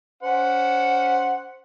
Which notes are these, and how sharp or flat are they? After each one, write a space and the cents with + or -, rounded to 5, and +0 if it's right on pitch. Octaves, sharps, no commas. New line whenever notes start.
C#4 +30 C5 +5 F#5 +0